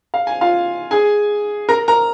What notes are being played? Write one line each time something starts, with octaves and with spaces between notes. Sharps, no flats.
F5
G#5
F4 F5
G#4 G#5
A#4 A#5
A#4 A#5